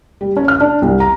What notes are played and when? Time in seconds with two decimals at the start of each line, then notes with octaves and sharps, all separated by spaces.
0.21 G3
0.37 C#4
0.48 F6
0.60 D4
0.82 C2
1.00 A#5